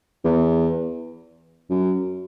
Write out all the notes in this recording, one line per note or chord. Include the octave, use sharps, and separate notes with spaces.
E2
F#2